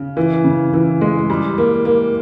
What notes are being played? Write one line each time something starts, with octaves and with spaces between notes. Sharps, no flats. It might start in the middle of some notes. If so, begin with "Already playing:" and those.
Already playing: C#3
E3
C#3
E3
G#3
G3
A#3
A#3